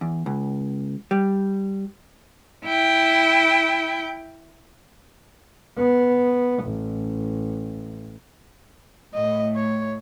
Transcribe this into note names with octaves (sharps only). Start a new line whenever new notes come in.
E2
C#2
G3
E4 G5
B3
A1
A2 D#5
C#5